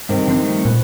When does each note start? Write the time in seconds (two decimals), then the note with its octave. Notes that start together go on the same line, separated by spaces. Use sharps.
0.09 G2 C3 D#3
0.27 D3 F3 C4
0.43 G3 A3
0.65 A#2 B4